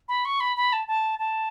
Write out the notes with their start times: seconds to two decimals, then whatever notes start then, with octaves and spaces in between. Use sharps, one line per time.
0.08 B5
0.25 C#6
0.40 B5
0.57 B5
0.73 A5
0.88 A5
1.19 A5